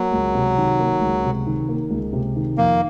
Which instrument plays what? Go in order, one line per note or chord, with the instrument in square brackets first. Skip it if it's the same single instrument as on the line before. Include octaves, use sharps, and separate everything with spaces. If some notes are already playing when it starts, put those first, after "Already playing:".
Already playing: [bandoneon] F#3 [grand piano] A#3
[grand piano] C#2
C3
D#3
A#3
C#2
C3
D#3
A#3
C#2
C3
D#3
[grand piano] F2 [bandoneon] A#3